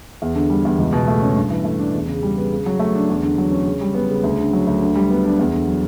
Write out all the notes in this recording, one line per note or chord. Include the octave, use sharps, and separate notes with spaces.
E2
D3
G3
E2
C#2
B2
A3
C#4
G2
E3
A3
D4
E2
C#3
G3
B3
C#3
F#3
A3
D4
E2
D3
F#3
C#4
C#3
G3
B3
C#3
D2
D3
F#3
D2
D3
G3
B3
D4
E2
D3
F#3